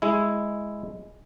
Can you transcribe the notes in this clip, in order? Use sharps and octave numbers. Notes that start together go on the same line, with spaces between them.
G#3 E4